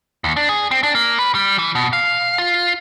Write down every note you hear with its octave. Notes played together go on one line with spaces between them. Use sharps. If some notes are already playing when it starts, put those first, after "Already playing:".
D#2
D4
G#4
C4
D4
A#3
B4
G3
E3
B2
F5
F4